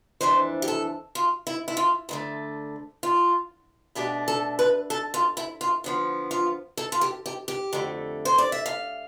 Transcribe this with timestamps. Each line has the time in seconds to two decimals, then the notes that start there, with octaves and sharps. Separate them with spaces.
0.21 F2 E3 A3 D4 C5
0.62 G4
0.68 A4
1.15 F4
1.47 E4
1.68 E4
1.77 F4
2.09 D2 D3 A3
3.03 F4
3.95 B2 A3 D4 G4
4.28 A4
4.59 B4
4.90 A4
5.14 F4
5.37 E4
5.61 F4
5.84 D3 F3 B3
6.31 F4
6.77 A4
6.92 F4
7.01 G4
7.26 G4
7.48 G4
7.73 F2 D3 A3
8.25 C5
8.38 D5
8.52 E5
8.66 F5